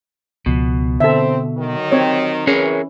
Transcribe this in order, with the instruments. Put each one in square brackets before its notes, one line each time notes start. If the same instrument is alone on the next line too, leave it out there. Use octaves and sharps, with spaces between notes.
[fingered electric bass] C#2 F3 [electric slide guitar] B2
[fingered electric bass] D3 [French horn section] C4 [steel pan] A4 E5
[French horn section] D#3 F#3
[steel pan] C4 C#5
[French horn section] E3 [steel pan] C#4 [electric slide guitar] G#4 A#4 C#5